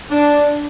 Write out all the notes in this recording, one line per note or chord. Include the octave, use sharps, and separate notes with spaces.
D4